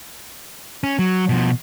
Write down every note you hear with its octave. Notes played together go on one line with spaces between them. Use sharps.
C#4
F#3
B2 F3